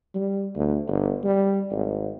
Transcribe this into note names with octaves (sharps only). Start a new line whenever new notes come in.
G3
D2
G1
G3
G#1